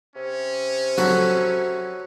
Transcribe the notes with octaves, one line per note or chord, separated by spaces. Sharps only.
C3 C#4
F#3 F#4 A4 B5